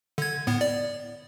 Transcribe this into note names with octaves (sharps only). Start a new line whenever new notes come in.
D3 G#6
A2 B3
D5